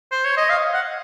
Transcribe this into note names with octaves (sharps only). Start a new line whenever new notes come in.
C5
C#5
D#5
F5
F#5